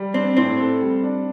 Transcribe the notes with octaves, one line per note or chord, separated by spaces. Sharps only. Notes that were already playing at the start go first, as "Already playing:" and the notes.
Already playing: G3
C4 D4
A2 C4
A4
G3
D4